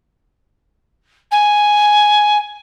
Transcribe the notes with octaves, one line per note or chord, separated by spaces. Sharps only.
G#5